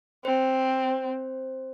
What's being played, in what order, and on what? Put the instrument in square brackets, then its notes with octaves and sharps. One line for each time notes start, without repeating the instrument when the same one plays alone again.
[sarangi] C4 [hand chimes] C5